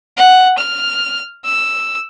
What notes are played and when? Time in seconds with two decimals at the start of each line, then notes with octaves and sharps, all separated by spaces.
0.17 F#5
0.58 F6
1.45 E6